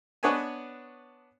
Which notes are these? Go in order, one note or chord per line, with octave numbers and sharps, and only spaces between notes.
B3 D4 B4 C#5 D#5 G#5